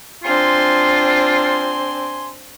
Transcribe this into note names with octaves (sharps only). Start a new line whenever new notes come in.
C4 D4 F4 G#5 C6